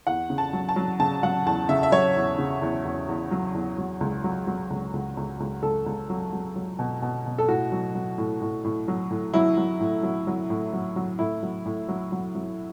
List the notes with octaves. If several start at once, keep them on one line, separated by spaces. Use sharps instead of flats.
E2 F#5
C#3
A5
F#3
A5
F#3
C#3 A5
F#3 F#5
E2 A5
C#3 E5
E5
F#3 C#5
E2
C#3
E2
E2
E2
F#3
E2
F#3
C#2
F#3
F#3
C#2
C#2
C#2
C#2
C#2 A4
C#2
F#3
F#3
F#3
B2
B2
B2
A4
A2 F#4
F#3
F#3
A2
A2
A2
F#3
A2
F#3 E4
F#3
A2
F#3
F#3
A2
F#3
F#3
A2 E4
F#3
A2
F#3
F#3
F#3